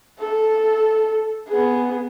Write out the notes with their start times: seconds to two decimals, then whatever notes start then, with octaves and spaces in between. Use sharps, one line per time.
0.19 A4
1.48 B3 G#4